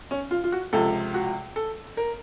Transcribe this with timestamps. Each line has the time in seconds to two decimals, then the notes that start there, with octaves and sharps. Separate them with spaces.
0.11 C#4
0.31 F4
0.44 F4
0.52 F#4
0.73 C#2 C3 F3 A4
1.14 F#4
1.56 A4
1.97 A#4